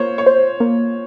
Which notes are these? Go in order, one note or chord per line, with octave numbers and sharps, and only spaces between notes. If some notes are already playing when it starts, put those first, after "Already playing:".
Already playing: A#3 F4 C5 C#5
C#5
C5
A#3